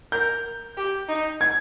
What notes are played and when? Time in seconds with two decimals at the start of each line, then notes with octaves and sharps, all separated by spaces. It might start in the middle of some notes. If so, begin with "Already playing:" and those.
0.12 A#4 G6
0.77 G4
1.09 D#4
1.41 G#6